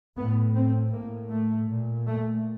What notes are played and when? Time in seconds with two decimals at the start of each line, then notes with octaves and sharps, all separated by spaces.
0.16 A2 B3
0.55 C4
0.92 A2 A#3
1.31 A3
1.68 A#2
2.06 A3